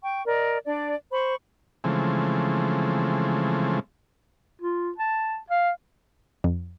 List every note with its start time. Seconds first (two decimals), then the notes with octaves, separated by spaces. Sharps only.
0.01 G5 C#6
0.26 A#4 D5 D#5
0.65 D4 D5
1.11 C5 B5 C#6
1.84 C#3 E3 F3 G#3 A3 C4
4.62 F4
4.98 A5
5.50 F5
6.44 F2